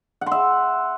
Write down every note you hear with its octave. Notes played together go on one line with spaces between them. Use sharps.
F#5
C6
E5